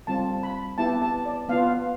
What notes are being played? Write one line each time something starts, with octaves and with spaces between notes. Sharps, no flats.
G3 C4 F4 A5
B5
B3 E4 G4 A5
A5
D5
B3 F4 F5